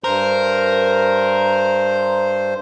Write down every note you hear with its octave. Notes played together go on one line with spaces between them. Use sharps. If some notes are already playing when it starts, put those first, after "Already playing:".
G2 A#4 C5